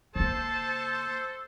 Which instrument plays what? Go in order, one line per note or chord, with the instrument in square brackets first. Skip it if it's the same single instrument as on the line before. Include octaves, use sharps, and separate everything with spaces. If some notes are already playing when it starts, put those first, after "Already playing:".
[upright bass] C#3 A#3 [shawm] A4 [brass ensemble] C5 [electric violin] A5